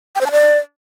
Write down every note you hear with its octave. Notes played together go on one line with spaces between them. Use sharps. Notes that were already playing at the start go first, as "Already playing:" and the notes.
G5
C5
A5
D5